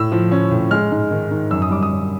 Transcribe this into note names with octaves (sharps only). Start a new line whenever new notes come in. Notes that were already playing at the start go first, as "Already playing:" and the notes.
Already playing: A2 E6
F3
C#4
A2
G#3 F6
G#2
D#3
D#3
F#2 E6
D#6
G3 D6
D#6
F#2